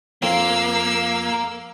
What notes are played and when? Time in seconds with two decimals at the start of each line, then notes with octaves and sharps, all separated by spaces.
0.22 F2 A#3 F5 E6